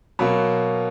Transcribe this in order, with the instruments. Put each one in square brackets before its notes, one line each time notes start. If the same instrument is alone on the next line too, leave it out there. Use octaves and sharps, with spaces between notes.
[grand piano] B2 F#3 A#3 B5